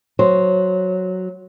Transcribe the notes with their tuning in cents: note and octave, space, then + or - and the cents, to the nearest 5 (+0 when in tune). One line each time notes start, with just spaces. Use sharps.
F#3 +0 C5 +0